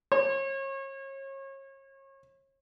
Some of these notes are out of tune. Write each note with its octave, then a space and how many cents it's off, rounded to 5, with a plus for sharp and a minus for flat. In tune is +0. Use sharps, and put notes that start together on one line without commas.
C#5 -35